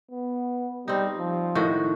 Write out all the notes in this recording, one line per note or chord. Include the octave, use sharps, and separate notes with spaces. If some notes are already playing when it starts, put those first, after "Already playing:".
B3
G3 C4 D#4
F3
A2 D#3 F#4